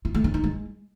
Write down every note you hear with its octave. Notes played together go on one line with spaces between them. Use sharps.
F4
A3
D4
D#4
G#3